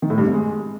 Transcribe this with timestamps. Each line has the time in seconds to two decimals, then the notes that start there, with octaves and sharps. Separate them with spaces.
0.02 D#3
0.10 A2
0.18 G2
0.26 F2
0.33 G#3